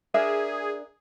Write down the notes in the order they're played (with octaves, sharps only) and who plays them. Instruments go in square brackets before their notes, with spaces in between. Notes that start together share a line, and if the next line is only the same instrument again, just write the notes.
[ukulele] D4 A#4 E5 [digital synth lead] G#4